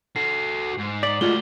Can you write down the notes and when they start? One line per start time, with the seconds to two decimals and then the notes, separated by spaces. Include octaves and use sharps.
0.16 F#4 A4 C7
0.78 G#2
1.03 D5 D6 B6 F#7
1.21 G#3 A3 F4 F#4 D5 G7